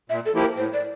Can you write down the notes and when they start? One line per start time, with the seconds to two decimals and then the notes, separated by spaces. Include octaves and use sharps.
0.10 A#2 E5
0.26 A4
0.33 F3 A#3 E4 G4
0.42 A#4
0.57 A2 C5
0.73 D5